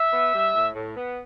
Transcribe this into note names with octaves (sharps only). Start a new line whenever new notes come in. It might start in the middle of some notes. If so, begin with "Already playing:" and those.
Already playing: E5
B3
G3
A2
A2
B3